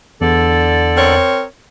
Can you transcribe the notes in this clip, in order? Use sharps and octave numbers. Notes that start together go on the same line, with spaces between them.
E2 D3 A4 D5
C4 A#4 C#5